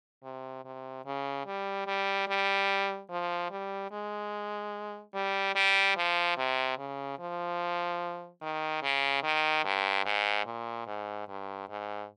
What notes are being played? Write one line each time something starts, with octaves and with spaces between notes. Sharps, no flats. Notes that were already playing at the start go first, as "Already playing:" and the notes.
C3
C3
C#3
G3
G3
G3
F3
G3
G#3
G3
G3
F3
C3
C#3
F3
D#3
C#3
D#3
G2
G#2
A#2
G#2
G2
G#2